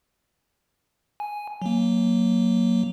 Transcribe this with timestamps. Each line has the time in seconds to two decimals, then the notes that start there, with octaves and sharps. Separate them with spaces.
1.20 G#5
1.62 F#3 A#3